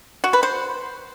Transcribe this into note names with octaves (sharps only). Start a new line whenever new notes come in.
F#4
B4
C5